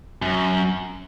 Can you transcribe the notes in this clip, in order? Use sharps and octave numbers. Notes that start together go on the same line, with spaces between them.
F#2